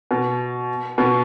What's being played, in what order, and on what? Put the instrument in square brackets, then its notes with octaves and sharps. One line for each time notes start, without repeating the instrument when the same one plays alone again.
[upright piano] B2
B2